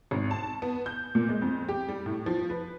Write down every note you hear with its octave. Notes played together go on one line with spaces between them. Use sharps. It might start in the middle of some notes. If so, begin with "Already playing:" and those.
G#1
A5
B3
G6
A#2
G#3
F2
G4
G3
A2
F3
B4